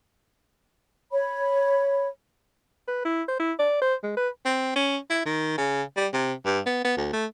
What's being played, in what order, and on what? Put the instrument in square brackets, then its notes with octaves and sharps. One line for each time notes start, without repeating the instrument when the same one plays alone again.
[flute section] C#5 B5
[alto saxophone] B4
E4
C5
E4
D5
C5
G#3
B4
[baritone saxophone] C4
C#4
E4
D#3
C#3
G3
C3
G2
B3
B3
D2
A3